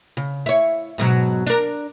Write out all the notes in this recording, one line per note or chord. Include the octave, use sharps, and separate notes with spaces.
C#3
E4 C#5
G#2 B2 F#3
D4 A#4